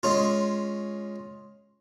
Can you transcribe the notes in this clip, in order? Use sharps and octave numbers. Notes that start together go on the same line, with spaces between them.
G#3 C#4 F4